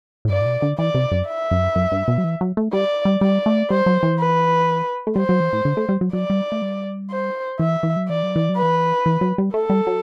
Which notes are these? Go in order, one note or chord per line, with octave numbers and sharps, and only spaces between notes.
A2
G2 D5
A2
B2
D3
E3 D5
C3
F#2
E5
F#2
F#2
G2
B2
F#3
E3
F#3
A3
G3 D5
G3
G3 D5
A3
G3 C5
F#3
E3
B4
A3
G3 C5
F#3
E3
A2
D3
A3
G3
F#3
F#3 D5
G3
A3
G3
C5
E3 E5
E3
F#3
E3 D5
F#3
E3
F#3
B4
E3
E3
F#3
G3
A3 A4
G3
F#3